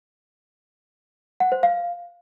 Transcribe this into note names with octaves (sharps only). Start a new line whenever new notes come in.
F#5
C5
F5